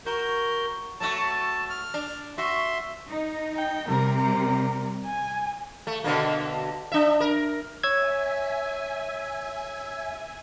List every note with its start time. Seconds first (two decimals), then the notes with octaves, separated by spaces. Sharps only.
0.06 F#4 A#4 G6
1.00 F#3 A3 F#4 A5
1.70 F6
1.94 D4
2.38 F#4 E5 C6
3.09 D#4
3.57 G5
3.88 C3 G3 A#4
4.18 A#4
5.05 G#5
5.87 A3
6.04 B2 D3 A#3
6.92 D4 E5
7.20 A#4
7.84 C#5 E5 G#5 E6 G#6